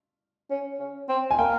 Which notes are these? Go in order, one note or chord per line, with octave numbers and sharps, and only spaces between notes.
C#4
C#4
C4
G#5
A#3 G5